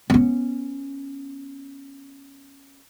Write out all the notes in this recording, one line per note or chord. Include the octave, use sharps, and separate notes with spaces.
B3 C#4